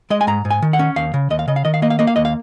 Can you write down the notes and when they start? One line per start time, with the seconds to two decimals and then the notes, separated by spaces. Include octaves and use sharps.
0.10 G#3 D#5
0.21 G#5
0.27 G#2 A#5
0.45 G#2
0.50 G#5
0.62 D#3
0.73 F#5
0.79 C#4
0.96 D#2 F5
1.14 C#3
1.30 D#2 D#5
1.39 F5
1.48 C#3 D#5
1.56 F5
1.65 D#3 D#5
1.74 F5
1.82 A#3 D#5
1.90 F5
1.99 A#3 D#5
2.07 F5
2.16 D#2 D#5
2.25 F5